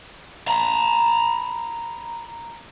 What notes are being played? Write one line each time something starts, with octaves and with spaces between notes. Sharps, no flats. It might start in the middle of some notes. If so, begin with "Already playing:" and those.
A#5 B5